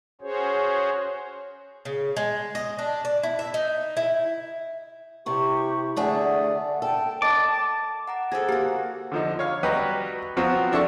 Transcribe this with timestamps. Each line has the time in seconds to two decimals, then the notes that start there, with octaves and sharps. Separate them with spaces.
0.21 C#4 F#4 G#4 C5 C#5
1.85 C#3
2.17 G#3
2.55 D#5
2.79 D4
3.05 D5
3.23 E4
3.39 E5
3.54 D#4
3.97 E4
5.26 C3 E4 G4 C#6
5.97 D3 A3 G#4 D5 F#5
6.82 A4 G5
7.22 D#5 A5 D6 A6
8.08 F#5 A#5 D6
8.32 G#4 A4 C5 G#5 G#6
8.49 A#3 F#4 G4
9.12 D3 F3 D#4
9.39 C#5 F5
9.63 F#3 G3 F#4 G4 B4 D#5
10.37 F3 F#3 B3 C4 F4 F#4
10.72 F3 D4 E4 A4 C#6